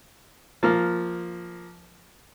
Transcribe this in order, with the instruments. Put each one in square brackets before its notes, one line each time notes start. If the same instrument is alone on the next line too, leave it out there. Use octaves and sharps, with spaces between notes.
[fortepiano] F3 A#3 F6